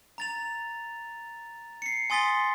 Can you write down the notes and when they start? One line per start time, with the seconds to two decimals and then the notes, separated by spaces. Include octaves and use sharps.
0.18 A#5 A6 F7
1.82 C7 C#7
2.10 G#5 C6 D#6 A6 B6 G7